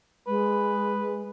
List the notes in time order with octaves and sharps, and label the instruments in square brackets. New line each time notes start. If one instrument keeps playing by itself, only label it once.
[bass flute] G#3 [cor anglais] B4